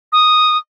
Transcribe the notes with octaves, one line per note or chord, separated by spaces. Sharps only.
D#6